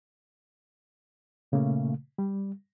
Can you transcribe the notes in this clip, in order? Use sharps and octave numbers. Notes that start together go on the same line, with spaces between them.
A#2 C#3 A3 A#3
G3